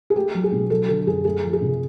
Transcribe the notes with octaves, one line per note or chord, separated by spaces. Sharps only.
G#4
A3 G4
F#3
G#4
B2
F#3 A4
D3 A4
F#2 G#4
A3 G#4
F3
G#4
C3